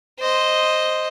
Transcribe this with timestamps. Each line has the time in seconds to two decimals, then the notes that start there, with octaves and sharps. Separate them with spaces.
0.19 C5 D#5